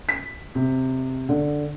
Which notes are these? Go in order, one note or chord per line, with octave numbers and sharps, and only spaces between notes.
B6
C3
D3